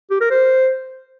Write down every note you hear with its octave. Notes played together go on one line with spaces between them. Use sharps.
G4
A#4
C5